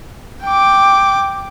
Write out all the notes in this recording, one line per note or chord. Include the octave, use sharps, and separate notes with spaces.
G5 D6